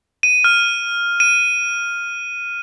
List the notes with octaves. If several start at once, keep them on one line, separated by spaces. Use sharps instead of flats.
D#7
F6
D#7